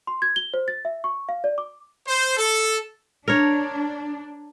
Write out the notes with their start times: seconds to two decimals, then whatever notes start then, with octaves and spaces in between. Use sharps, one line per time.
0.07 C6
0.22 G#6
0.36 G7
0.54 C5
0.68 A6
0.85 E5
1.04 C#6
1.29 F5
1.44 D5
1.58 D6
2.07 C5
2.36 A4
3.28 D4 A#4 C#5